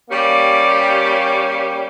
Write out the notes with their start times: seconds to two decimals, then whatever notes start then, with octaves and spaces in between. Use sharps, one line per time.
0.10 G3 A#3 C#4 G4